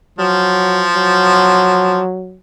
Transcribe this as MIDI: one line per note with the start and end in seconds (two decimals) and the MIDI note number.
0.19 2.00 53
0.19 0.87 54
0.96 2.38 54